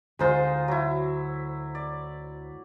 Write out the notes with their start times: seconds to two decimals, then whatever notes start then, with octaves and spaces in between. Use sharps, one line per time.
0.19 D2 G#3 D#4 F4 C5
0.68 F#3 E4
1.75 D5